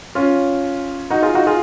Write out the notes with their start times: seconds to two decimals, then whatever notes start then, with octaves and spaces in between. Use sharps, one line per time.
0.15 C#4 F4
1.10 D#4 F#4
1.22 F4 G#4
1.35 D#4 F#4
1.47 F4 G#4